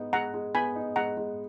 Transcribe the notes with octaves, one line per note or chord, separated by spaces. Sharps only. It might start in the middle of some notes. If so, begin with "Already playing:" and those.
Already playing: G#3 B3 D#4
G#3 F#5 A#5
G#3
B3 G#5 B5
D#4
G#3 F#5 A#5
G#3